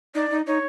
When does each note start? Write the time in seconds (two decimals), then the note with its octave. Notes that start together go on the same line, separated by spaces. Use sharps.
0.15 D#4 D5
0.30 D#4
0.47 D#4 C#5